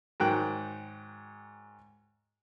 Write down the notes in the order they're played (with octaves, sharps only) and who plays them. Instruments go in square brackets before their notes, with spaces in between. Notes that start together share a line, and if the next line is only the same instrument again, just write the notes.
[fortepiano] G#2 D#3 F#3 G5 F#6